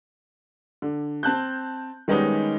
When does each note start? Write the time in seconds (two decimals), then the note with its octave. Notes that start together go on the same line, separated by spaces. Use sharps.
0.82 D3
1.23 C4 A5 F#6 G6
2.08 D#3 G3 G#3 B3 C#4 D#4